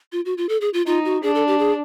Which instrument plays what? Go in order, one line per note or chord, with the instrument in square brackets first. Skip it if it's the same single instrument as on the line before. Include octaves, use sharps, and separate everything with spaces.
[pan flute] F4
F#4
F4
A4
G#4
F4
[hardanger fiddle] D#4 [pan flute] F4
[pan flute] F#4
[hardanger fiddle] D4 [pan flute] G#4
[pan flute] A4
G4
G#4